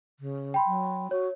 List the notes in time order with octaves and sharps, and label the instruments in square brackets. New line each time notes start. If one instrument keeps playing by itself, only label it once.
[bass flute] C#3
[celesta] G5 B5 C6
[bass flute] F#3
[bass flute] F#4 [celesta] C#5